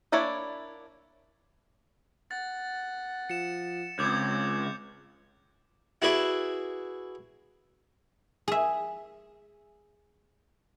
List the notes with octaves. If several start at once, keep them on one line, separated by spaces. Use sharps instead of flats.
A#3 D4 E4 C#5 D5
F#5 A6
F3 C#7 E7
C#2 C4 D6 G6 G#6
E4 F#4 G#4 B4 D5 E5
G#4 E5